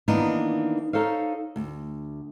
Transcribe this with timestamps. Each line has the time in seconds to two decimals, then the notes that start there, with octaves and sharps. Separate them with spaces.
0.08 D#3 E3 A#3 B3 D4 D#4
0.93 D#4 A4 C5 C#5 F5
1.56 D2